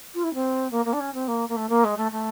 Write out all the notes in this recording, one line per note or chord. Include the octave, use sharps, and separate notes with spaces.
F4
E4
C4
A#3
A#3
D4
C#4
C4
A#3
A#3
A3
A#3
G#3
A3
A3